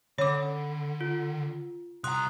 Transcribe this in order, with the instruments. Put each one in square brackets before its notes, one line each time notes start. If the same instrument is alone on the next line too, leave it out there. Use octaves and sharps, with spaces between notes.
[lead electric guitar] D3 [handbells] C#4 B5 [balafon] C#5 D6
[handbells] F4
[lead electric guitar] C2 A#5 [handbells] C6 D#6 F#6